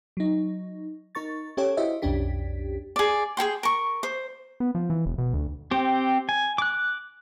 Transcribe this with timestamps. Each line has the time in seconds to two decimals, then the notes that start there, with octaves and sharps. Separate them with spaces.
0.17 F#3 D#4
1.15 D#4 A#4 C#6 A6
1.57 C#4 G4 A4 C#5
1.77 E4 F#4 G4 C5 D#5 E5
2.02 B1 F2 C#4 D4 G4 B6
2.96 G#4 D5
3.37 G#4 A4 G5 C6
3.63 A#4 C#6
4.03 C5
4.60 B3
4.75 F3
4.90 E3
5.06 E1
5.18 B2
5.33 D2
5.71 C4 G4
6.29 G#5
6.58 D6 F#6